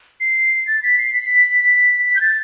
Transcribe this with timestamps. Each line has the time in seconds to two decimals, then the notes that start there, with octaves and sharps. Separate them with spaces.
0.20 C7
0.67 A6
0.83 B6
0.98 C7
1.13 B6
1.60 B6
2.06 B6
2.16 G6
2.21 A6